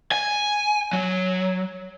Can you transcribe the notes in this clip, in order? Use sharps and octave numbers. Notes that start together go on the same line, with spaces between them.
G#5
F#3